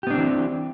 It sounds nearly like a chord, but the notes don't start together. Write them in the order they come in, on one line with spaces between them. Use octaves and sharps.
G4 B3 D4 C4 E3